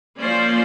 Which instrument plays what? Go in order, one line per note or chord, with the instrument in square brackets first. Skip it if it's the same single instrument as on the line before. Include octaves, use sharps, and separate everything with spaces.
[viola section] F3 A#3 C#4 C5 D5